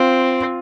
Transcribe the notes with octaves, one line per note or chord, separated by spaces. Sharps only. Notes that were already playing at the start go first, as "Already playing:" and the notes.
Already playing: C4 F4